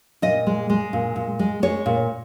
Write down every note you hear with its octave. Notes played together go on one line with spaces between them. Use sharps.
A#2 D#5
G#3
G#3
A#2
A#2
G#3
G#3 C#5
A#2